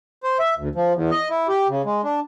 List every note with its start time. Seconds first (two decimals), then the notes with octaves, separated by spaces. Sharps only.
0.24 C5
0.39 E5
0.58 D2
0.75 F3
0.95 E2
1.11 D#5
1.30 E4
1.48 G4
1.69 C#3
1.85 G#3
2.04 D4